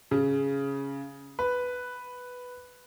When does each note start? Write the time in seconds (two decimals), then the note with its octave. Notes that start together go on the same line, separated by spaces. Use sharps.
0.11 C#3
1.39 B4